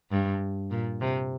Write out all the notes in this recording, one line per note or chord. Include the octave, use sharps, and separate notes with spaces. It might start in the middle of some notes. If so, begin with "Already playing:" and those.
G2
A#2
C3